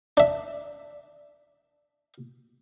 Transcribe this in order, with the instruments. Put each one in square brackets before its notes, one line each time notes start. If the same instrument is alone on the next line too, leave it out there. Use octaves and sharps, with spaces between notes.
[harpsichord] D4 E5